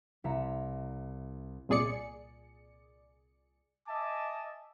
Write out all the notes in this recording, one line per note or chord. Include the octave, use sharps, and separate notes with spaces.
C2 E4 E5 A#5 C#7
C2 A#2 G#4 D5 C#7
D#5 E5 G#5 A5 D6